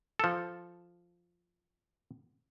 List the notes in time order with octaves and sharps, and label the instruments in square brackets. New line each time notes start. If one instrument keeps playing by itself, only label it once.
[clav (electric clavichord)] F3 A4